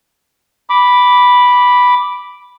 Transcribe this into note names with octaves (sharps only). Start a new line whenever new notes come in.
B5 D6